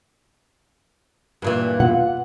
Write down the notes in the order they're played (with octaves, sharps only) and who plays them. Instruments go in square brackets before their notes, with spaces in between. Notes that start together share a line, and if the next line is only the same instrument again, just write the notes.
[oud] G2 A#2 E3
[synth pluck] B2 [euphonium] F4 [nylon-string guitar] F#5